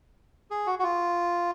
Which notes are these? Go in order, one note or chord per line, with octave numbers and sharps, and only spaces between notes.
G#4
F#4
F#4
F4